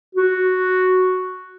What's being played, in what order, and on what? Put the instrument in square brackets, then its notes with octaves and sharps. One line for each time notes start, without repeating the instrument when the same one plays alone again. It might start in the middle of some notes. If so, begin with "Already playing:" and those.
[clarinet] F#4